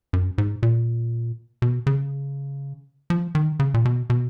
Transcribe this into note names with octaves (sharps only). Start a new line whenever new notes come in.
F#2
G#2
A#2
B2
C#3
F3
D#3
C#3
A#2
B2
B2